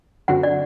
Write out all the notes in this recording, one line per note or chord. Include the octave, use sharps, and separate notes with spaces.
F#2 D3 F#3 C4 F#4 F#5
D5